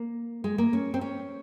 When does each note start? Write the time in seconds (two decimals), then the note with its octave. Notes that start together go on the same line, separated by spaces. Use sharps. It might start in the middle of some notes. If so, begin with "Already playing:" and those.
Already playing: A#3
0.44 G#3
0.58 A#3
0.73 C#4
0.94 C4
1.01 C#4